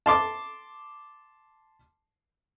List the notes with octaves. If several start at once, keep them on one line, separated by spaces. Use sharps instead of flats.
A5 C6 D6